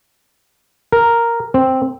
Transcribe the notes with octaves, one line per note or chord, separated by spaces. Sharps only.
A#4
C4